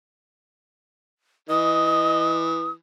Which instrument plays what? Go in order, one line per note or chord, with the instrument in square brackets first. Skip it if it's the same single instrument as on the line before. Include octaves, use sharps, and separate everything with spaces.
[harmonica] E3 [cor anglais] D#5 [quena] D#6